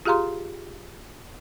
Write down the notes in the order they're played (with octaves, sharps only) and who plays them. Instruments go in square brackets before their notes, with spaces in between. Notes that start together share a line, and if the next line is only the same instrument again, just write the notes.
[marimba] F4 G4 G#4 F5 A#5 C6